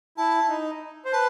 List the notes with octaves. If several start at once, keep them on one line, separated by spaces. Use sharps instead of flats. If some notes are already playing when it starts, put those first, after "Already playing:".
E4 A5
D#4
C5
B4 A5